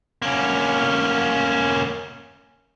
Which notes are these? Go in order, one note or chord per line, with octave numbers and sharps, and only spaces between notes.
A#3 C#4